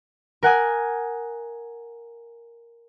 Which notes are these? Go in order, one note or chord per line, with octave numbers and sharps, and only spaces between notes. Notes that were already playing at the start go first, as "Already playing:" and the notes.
A#4 F#5 G#5 D#6